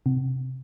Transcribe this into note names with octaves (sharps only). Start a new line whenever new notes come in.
C3